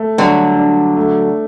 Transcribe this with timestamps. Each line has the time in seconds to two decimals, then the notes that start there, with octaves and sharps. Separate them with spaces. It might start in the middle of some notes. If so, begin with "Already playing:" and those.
Already playing: A3
0.18 D3 F#3 G3
0.57 D4
0.97 A3